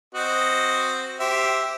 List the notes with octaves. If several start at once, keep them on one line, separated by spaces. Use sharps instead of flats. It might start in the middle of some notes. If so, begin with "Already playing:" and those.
C4 F#4 D#5
G4 C5 E5